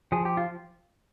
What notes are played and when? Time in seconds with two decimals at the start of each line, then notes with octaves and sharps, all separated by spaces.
0.12 F3 G#4
0.25 G4
0.37 F4